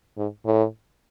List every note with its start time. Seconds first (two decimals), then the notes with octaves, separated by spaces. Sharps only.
0.18 G#2
0.46 A2